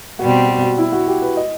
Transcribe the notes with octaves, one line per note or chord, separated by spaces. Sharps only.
B2 G3 C4 F#4
F#4
F#4
E4
F#4
G4
B4
D#5